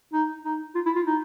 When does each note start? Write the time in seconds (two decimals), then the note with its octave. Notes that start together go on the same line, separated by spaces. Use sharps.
0.13 D#4
0.45 D#4
0.75 F4
0.86 E4
0.96 F4
1.06 D#4